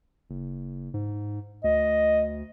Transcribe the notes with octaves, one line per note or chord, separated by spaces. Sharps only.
F#1
G#2
D2 D#5